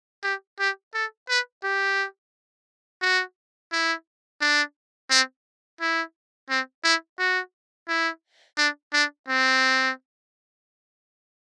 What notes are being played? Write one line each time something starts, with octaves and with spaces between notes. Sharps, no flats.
G4
G4
A4
B4
G4
F#4
E4
D4
C4
E4
C4
E4
F#4
E4
D4
D4
C4